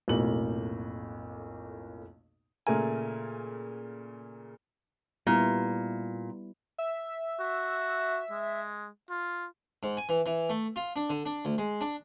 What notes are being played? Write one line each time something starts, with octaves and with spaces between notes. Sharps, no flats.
B1 F2 A2 A#3 F#7
A#2 C#3 A3 A#4 G#5
A#2 G3 B3 E4
E5
F#4
G#3
F4
G#2
G#5
E3
E3
A3
F4
D4
D3
D4
D2
G#3
D4